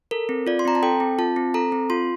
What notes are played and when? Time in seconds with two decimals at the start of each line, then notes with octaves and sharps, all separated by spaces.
0.11 A4 A#4
0.29 C4
0.47 F4 D5
0.59 C6
0.65 C4 A#5
0.75 A5
0.83 A4 G5
1.00 C4
1.19 F4 A5
1.36 C4
1.54 A4 A#5
1.72 C4
1.90 F4 C6